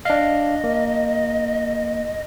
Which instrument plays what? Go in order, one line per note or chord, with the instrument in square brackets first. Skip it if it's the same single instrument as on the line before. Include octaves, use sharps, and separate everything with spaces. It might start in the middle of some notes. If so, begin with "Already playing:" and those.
[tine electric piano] D4 F5 [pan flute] D#5
[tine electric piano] A#3